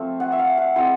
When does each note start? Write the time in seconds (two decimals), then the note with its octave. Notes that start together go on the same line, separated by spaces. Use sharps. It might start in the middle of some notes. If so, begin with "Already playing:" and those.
Already playing: F3 A3 C4 F5
0.20 F#5
0.32 E5
0.39 F5
0.58 F#5
0.76 G#3 C4 E4 G5